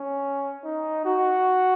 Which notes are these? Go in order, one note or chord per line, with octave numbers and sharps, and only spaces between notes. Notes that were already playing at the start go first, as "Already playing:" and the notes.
Already playing: C#4
D#4
F#4